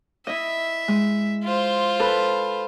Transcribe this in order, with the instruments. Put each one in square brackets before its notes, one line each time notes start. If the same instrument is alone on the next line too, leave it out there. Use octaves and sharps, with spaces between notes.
[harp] E4 D#5 [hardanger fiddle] E5
[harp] G#3
[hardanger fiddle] F4 C5
[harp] A4 B4